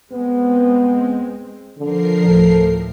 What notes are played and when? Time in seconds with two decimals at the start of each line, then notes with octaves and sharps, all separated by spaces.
0.12 G#3 B3 C4
1.78 D3 F3 A#4 C7
2.25 D2 A2 A3 A4